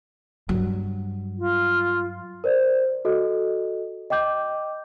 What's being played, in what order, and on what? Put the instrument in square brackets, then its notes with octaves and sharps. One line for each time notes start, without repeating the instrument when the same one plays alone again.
[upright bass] G2 F#3
[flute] F4
[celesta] A#4 C5 D5
F#4 A4 D#5
D#5 G5 D6 G6